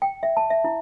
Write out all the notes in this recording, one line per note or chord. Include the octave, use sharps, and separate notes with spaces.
G5
E5
A5
E5
E4